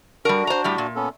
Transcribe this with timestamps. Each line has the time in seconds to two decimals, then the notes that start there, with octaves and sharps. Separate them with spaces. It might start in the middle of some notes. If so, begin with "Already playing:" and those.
0.25 G3 D4 F#4 A#4
0.47 C5 A#5
0.64 A2 G3 G4
0.78 A#2
0.96 B3 C#4 A4